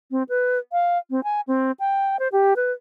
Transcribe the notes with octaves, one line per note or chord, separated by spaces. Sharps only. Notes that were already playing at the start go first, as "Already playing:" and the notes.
C4
B4
F5
C4
G#5
C4
G5
C5
G4
B4